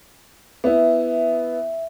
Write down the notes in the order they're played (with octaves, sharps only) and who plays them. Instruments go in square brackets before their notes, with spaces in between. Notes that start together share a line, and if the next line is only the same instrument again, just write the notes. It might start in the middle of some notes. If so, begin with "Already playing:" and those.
[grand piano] B3 E4 [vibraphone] E5